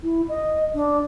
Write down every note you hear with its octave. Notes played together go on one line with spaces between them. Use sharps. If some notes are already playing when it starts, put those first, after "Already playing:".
E4
D#5
D4